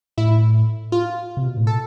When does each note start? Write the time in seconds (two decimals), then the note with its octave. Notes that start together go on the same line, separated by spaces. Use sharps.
0.17 A2 E4
0.92 F4
1.37 C3
1.47 B2
1.57 A2
1.67 A4